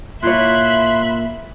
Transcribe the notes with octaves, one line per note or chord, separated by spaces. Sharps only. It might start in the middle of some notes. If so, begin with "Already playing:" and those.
A#2 E4 F4 C#5 E5 B5 C6 F#6